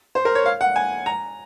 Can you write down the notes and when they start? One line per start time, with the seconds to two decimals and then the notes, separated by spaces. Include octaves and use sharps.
0.15 C5
0.25 A#4
0.35 C#5
0.46 F5
0.61 F#5
0.76 G#5
1.06 A#5